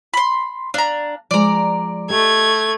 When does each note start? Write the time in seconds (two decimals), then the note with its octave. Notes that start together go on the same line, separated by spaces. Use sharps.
0.14 B5 C6
0.74 D4 F5 A#5
1.31 F3 G#3 D5 A#5
2.10 A3 G4 D#5 G#6